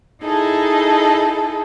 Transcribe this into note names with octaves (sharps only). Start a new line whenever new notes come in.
D#4 E4 G#4 A4 D#5